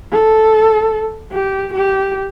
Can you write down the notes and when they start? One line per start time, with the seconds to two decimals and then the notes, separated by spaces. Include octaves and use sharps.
0.12 A4
1.32 G4
1.74 G4